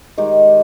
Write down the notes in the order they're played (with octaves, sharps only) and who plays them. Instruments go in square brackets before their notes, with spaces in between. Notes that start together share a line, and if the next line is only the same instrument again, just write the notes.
[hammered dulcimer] D#3 G#3 D#4 G4